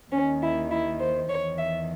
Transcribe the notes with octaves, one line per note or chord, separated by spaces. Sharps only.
D#2 D#3 C#4
E4
E4
C5
E2 D#3 C#5
E5